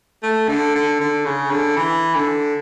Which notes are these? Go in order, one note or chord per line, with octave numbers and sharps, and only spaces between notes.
A3
D3
D3
D3
C#3
D3
E3
D3